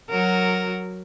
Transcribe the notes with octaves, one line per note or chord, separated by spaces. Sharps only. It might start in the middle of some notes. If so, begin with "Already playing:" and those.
F#3 F#4 A#4